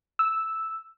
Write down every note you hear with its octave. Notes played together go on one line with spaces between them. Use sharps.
E6